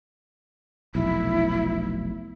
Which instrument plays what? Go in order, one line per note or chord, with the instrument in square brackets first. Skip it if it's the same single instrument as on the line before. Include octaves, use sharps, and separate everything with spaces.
[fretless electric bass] F1 B1 [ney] E4